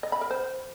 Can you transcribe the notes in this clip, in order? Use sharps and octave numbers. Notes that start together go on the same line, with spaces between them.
D#5
B5
A#4
C5